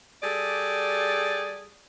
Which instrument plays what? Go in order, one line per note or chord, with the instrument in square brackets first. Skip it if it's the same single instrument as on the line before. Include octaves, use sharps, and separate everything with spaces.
[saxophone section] G3 G#4 A4 D5